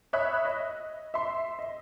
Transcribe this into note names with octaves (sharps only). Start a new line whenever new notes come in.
C#5 E5 B5 D#6 F#6
D#5
E5 C6
D#5